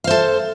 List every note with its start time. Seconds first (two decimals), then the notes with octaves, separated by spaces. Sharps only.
0.04 F5
0.07 C5
0.10 A4